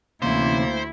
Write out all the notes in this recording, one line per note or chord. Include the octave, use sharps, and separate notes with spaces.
D2 C3 E3 A#3 C#4 E4 C5